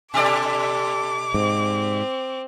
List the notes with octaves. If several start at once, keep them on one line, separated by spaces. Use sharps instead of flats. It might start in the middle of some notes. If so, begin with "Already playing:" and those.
B2 G4 A4 D5 D6
G#2 C4